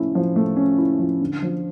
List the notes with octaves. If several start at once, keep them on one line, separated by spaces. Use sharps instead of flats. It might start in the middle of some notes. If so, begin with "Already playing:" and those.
Already playing: F3 A3 C#4 E4
F3
A3
C#4
E4
F3
D3
F3